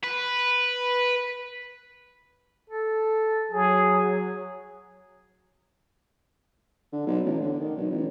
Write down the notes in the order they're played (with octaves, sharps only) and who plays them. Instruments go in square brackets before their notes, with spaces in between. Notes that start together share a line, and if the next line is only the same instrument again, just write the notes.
[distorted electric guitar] B4
[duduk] A4
[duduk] F#3 [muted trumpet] G#4
[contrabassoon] D3
B1
A1
D3
D#3
B1
A1